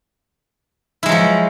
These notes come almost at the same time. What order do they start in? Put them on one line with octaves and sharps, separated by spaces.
E4 G#3 F#3 F3